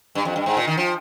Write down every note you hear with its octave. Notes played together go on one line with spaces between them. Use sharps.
G2
F2
G2
G#2
A#2
D#3
F3